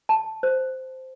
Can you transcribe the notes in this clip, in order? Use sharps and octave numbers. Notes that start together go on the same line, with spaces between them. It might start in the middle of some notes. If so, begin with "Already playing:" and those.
A5
C5